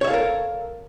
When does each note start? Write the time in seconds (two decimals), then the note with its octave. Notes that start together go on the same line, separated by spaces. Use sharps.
0.01 C#5
0.04 E5
0.07 F5
0.10 A4
0.13 A#4